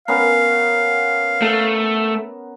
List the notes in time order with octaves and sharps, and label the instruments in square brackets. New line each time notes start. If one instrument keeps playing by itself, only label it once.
[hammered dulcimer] B3 C#4 A#4 [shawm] F5
[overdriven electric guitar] A3